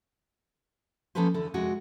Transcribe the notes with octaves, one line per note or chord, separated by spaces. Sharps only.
F3 A#3 C#4 A4 B4 C5
E2 D3 A4
F2 C3 G#3 F#4